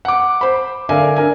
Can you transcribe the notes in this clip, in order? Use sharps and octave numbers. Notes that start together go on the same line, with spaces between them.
F#5 D6
C5 B5
D3 A#4 D5 E5 F5 G#5
D4 A#4 G#5